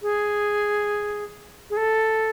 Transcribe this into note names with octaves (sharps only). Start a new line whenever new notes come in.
G#4
G#4
A4